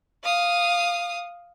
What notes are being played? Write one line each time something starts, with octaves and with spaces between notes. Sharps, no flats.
F5 D#6